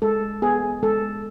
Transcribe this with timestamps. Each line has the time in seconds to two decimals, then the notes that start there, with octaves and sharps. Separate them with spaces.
0.02 G#3 A4
0.42 B3 G#4
0.83 G#3 A4